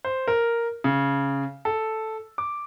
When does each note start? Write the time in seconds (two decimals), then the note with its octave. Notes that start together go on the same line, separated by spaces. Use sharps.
0.05 C5
0.28 A#4
0.84 C#3
1.65 A4
2.38 D6